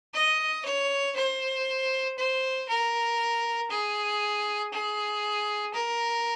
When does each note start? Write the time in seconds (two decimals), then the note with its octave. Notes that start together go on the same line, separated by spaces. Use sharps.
0.14 D#5
0.65 C#5
1.16 C5
2.18 C5
2.68 A#4
3.70 G#4
4.73 G#4
5.74 A#4